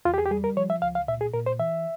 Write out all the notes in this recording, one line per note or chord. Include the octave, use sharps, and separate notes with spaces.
E2 F4
G4
G#4
G4
G3 G#4
A#4
F3 C#5
E5
C#2 F5
F5
A#2 E5
G#4
A#2 A#4
C5
E3 E5